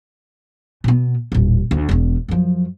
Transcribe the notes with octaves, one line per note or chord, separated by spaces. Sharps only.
B2 B3
D#1 A1
D2
E1 E2
F#2 F3